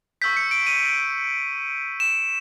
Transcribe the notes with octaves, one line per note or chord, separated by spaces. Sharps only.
C#6 E6 G6 B6
C#7
D7
D#7
E7